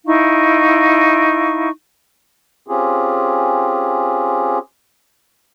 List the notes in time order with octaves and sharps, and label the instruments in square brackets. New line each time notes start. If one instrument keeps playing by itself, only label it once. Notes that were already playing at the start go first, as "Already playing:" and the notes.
[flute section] D#4 E4 F5 C#6
[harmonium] C4 C#4 F4 G4 G#4